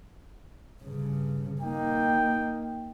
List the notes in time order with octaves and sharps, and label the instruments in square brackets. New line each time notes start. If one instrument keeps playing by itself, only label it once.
[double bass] G2 C#3
[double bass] A#3 D#4 [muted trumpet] G5